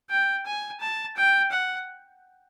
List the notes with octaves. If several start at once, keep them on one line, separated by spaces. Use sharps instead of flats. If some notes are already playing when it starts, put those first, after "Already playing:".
G5
G#5
A5
G5
F#5